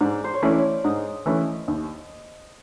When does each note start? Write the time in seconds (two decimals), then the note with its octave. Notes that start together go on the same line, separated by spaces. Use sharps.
0.01 G#2 D5
0.24 C5
0.34 C#5
0.42 E3 A3 C#4 E4 D5
0.84 G#2 D#5
1.26 E3 A3 C#4 E4
1.68 D#2